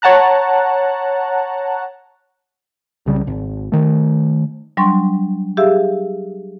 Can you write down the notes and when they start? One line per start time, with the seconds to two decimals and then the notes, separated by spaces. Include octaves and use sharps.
0.02 C#5 F#5 A5 A#5 F#6
3.06 C2 C#3 G3
3.27 G#1
3.72 D#3 A3
4.77 F#3 G3 D4 C6 C#6
5.57 G4 G#4 E5 F5 E6